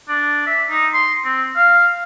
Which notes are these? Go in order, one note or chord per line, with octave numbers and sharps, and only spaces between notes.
D4
E5
D#4
C6
C4
F5